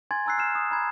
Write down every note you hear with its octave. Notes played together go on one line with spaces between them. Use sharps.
G#5 C6 G#6 A6
G#5 A#5 E6 F#6 C7
F6 C7 E7
D#6
A#5 B5 G#6